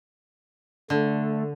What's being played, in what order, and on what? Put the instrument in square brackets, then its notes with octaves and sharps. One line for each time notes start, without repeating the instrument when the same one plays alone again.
[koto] D3 [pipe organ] A3